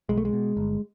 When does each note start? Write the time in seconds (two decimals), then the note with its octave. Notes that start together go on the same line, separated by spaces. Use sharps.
0.09 B1 G#3
0.17 A3
0.25 G#3
0.33 B2
0.57 G1